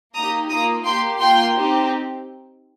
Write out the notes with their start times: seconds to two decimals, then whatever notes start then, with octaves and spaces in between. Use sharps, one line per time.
0.14 A#3 D#4 G4 A#5 D#6
0.49 A#3 F4 A#5 D#6
0.84 A#3 G4 G5 C6
1.19 A#3 F4 G5 C6
1.54 C4 D#4 G4